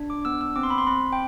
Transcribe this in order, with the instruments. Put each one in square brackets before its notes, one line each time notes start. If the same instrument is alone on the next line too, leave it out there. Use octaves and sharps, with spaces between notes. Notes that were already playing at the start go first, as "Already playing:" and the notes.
Already playing: [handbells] D4
D6
B3 E6
E6
C4 D6
C6
B5
C6
C4 B5
G5